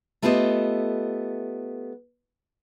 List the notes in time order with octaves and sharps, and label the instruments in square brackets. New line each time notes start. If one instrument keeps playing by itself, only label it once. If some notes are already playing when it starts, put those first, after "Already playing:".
[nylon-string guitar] A3 B3 F4 G4 A4 D#5